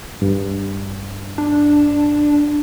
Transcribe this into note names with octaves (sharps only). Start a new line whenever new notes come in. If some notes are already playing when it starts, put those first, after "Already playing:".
G2
D4